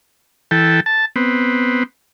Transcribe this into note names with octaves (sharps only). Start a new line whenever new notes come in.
E3 A4 G5
A5
B3 C4